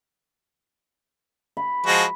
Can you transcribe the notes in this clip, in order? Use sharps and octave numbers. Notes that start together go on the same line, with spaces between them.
B5
F3 G#3 F#4